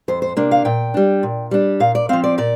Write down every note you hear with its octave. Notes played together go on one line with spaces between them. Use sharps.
F2 C5
C5
C3 A#3 D4
F5
A#2 G5
G3 D4
A#2
G3 D4
A#2 F5
D5
F3 C4 F5
D5
A#2 D5